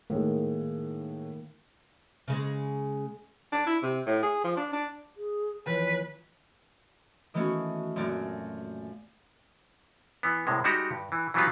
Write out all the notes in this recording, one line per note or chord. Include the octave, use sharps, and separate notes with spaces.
A2 D#3 G#3 A#3
C#3 G#3
D4
E4
C3
A2
G#4
F3
D4
D4
G#4
D#2 E3 F3 B4 C#5
D#3 E3 A3 B3 C#4 F#4
F#2 A#2 A3 C4 A#4 D5
E3 B3
C2 A2 C3 G#3
G3 G#3 D#4 F#4 G4
G2
E3
E3 F#3 G3 B3 D#4 F4